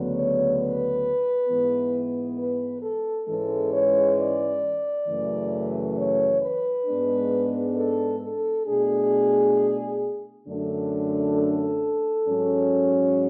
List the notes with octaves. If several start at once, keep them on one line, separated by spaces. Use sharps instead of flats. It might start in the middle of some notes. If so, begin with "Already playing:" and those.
Already playing: D2 C#3 F#3 B3
C#5
B4
G#2 E3 B3
B4
A4
G#2 E3 G#3 C#4 A4
C#5
D5
F#2 C#3 E3 A3
C#5
B4
G#2 G#3 B3 D4
A4
A4
B2 A3 D4 G#4
F#2 D3 A3 D4
A4
G#2 F#3 C#4